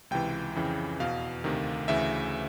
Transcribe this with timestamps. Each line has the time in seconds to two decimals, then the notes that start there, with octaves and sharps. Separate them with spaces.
0.11 C#2 C3 E3 G5
0.55 F2 C#3 E3
1.00 E2 B2 F5
1.44 D2 C3 D#3
1.88 D2 C#3 E3 E5